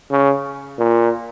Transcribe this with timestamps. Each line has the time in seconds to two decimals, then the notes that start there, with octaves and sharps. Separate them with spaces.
0.10 C#3
0.79 A#2